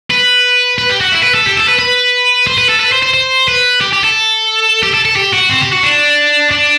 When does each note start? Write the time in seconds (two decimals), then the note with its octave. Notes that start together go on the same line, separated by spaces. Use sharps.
0.11 B4
0.78 B4
0.90 G4
1.01 F#4
1.12 E4
1.23 B4
1.34 A4
1.46 G4
1.56 A4
1.68 B4
1.79 B4
2.47 C5
2.58 B4
2.69 A4
2.80 B4
2.92 C5
3.02 C5
3.14 C5
3.48 B4
3.81 G4
3.93 G4
4.04 A4
4.83 G4
4.94 A4
5.05 A4
5.16 G4
5.34 F#4
5.50 C4
5.62 G4
5.73 F#4
5.83 D4
6.51 D4